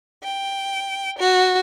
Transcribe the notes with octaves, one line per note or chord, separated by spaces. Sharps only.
G5
F#4